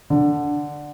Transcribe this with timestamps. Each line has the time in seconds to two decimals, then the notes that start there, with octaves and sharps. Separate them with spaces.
0.10 D3